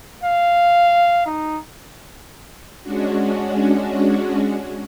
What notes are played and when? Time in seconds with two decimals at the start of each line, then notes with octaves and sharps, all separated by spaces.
0.24 F5
1.26 D#4
2.83 G#3 C#4 D4 F#4